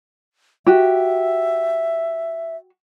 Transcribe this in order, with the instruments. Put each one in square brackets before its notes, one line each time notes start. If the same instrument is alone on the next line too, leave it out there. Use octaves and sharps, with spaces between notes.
[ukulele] F#4 G4 [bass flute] E5